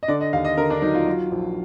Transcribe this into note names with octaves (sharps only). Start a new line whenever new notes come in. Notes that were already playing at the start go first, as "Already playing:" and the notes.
D#5
D3 D5
D#5
D#2 F5
D#5
D3 A#4
D4
F#3 D#4
F4
F#3
A#1